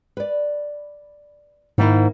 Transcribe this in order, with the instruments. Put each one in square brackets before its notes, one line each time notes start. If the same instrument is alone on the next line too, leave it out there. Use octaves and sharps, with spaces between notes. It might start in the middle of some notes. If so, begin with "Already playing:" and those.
[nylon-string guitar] B4 D5
[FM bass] G#2 [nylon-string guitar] D#3 A#3 E4